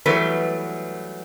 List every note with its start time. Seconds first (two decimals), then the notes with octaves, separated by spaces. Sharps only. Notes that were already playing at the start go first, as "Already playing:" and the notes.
0.06 E3 F#3 G3 A3 B3 B4